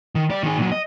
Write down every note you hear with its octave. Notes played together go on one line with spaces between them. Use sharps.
D#3
G3 D5
D#3 G#4
A#2 F#3
D#5